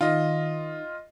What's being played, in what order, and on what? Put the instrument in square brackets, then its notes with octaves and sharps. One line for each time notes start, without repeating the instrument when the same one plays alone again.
[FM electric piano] D#3 [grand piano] F4 D#5